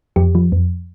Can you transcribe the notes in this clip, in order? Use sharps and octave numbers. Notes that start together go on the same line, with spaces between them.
F2 G4
F3
F2